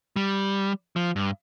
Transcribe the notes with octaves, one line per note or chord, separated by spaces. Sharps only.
G3
F3
G2